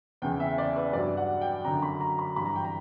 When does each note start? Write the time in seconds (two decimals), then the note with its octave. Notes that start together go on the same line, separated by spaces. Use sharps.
0.22 E2 C#3 E3 G5
0.40 E5
0.58 D5
0.76 B4
0.93 G2 F#3 D5
1.17 F#5
1.41 G5
1.65 F#2 D3 F#3 A#5
1.82 B5
2.01 A#5
2.19 B5
2.36 G2 E3 B5
2.45 A#5
2.56 G5
2.65 A#5